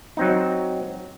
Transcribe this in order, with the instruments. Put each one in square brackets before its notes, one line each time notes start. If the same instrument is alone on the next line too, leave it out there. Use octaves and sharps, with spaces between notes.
[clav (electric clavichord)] F#3 C4 D#4